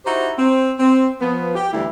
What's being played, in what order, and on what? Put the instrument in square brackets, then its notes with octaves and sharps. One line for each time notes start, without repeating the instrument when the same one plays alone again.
[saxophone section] D#4 E4 F#4 G4 C5
C4
C4
F3 B3
G4
D2 E3 G3 A3 E4